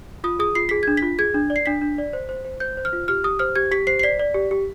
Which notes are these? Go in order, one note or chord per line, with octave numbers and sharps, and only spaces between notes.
F4 D#6
G#4 D#6
F4 C7
G#4 B6
D4 G#6
B6
F4
G#4 G#6
D4
D5
C7
D4 B6
D4
D5
C5
C5
C5
C5 G6
C5
F6
F4
G4 F6
G4 D#6
C5 F6
G4 G#6
G4 B6
C5 C7
C7
D5 B6
D5
G4
G4